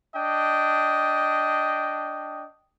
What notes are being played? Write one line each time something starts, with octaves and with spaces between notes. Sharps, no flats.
D4 D#5 G5